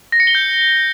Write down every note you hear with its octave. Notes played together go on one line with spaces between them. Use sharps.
A#6
C#7
G7
G6